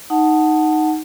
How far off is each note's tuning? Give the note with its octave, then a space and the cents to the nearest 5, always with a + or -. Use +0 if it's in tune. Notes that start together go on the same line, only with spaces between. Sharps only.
D#4 +0 F#5 +0 A5 +0